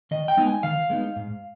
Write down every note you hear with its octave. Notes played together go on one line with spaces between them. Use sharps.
D#3 D#5
G5
G#3 B3 D#4
G#5
D#3 F5
G#3 B3 D#4
G#2